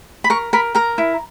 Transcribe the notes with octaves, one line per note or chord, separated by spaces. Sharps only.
B5
A#4 C#6
A#4 B5
A#4 A#5
E4